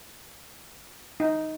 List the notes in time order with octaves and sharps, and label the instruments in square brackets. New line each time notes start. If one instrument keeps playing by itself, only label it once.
[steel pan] D#4